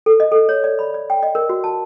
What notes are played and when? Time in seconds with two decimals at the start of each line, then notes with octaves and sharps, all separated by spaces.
0.06 A4
0.20 D#5
0.32 A4
0.49 C#5
0.64 D5
0.79 B5
0.94 D5
1.10 G5
1.23 D#5
1.35 A#4
1.49 F#4
1.64 A5